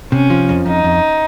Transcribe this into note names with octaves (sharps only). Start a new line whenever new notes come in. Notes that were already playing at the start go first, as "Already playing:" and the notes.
C3 C#4
F3
F2
F2 D#4
F2